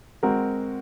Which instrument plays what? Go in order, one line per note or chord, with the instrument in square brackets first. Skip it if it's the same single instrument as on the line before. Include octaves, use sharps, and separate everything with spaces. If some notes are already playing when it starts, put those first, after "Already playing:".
[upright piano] G#3 C4 F#4 A#4